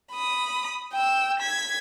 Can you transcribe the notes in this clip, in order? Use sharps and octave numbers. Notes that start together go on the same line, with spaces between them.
B5 D#6
G5 E6
G#6 B6